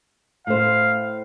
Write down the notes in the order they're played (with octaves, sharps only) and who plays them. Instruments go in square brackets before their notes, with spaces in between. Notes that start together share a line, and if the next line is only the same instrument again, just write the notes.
[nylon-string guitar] A2 C5 [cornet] F5